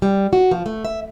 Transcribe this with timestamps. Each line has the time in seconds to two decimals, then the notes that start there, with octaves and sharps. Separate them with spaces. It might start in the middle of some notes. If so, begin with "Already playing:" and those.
0.02 G3
0.33 F#4
0.51 F3
0.66 A3
0.85 E5